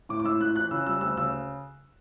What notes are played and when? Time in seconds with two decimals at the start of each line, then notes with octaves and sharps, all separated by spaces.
0.09 A2 D6
0.20 D6
0.24 A2 E6
0.41 A2 F#6
0.55 E3 F#6
0.71 C#3 E6
0.87 G3 E6
1.01 D2 E6
1.17 C#3 E6